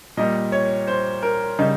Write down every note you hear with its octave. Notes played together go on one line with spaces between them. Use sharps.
A#2 G3 D#5
C#5
C5
A#4
C#3 G3 D#4